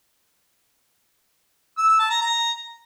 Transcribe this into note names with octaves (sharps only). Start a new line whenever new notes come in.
E6
E6
A5
A#5
A#5